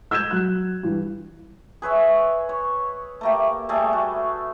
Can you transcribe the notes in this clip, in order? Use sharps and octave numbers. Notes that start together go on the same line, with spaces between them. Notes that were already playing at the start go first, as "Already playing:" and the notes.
E6 G6 G#6 E7
F#3 F#6
G2 E3
G#4 B4 C#5 E5
C#5
A3 A#3 G4
G3 A3 G#4 A4
F#4